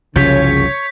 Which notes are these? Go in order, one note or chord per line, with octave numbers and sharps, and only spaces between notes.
F#1 C2 C#3 F3 C#5 G6 B6